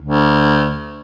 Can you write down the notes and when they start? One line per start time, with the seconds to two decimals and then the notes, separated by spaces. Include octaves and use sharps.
0.02 D2